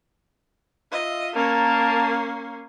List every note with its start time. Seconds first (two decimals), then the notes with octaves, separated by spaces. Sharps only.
0.92 F4 D#5 E5
1.34 A#3 C#4 A#4 A5